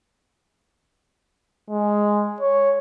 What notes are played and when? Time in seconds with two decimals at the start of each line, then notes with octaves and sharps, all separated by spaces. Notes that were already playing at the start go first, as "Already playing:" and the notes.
1.70 G#3
2.41 C#5